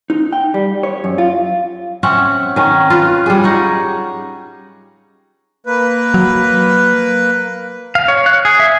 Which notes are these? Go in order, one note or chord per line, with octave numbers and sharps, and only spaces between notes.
D#4
G5
G3
C#5
F#2
F4
C4 C#4 E5 F#5
D#3 C#4
F4 B4
G3 G#4
D#4 C#5 F#5
A#3 B4
F#3
F5
C#5
F#6
G#4
E5